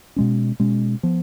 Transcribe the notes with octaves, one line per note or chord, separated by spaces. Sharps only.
B2 G#3 C#4
B2 G#3 C#4
F3 B3